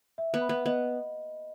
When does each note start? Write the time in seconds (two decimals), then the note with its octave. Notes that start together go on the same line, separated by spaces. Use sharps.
0.18 E5
0.34 B3
0.41 B5
0.49 B3
0.66 B3 D#5